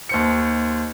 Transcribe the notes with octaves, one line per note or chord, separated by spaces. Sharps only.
D#2 C5 C#7